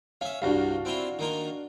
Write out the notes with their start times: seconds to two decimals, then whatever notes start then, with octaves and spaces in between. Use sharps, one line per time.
0.21 C#4 E5 F5
0.42 C2 G2 D4 F#4 F5
0.85 C4 E4 F4
1.19 D#3 A#3 F4